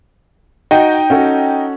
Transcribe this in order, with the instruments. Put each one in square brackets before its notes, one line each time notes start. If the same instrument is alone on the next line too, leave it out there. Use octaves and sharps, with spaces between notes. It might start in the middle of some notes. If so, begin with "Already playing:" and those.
[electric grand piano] D#4 D#5 G5 [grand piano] F#4
[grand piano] C#4 F#4 A4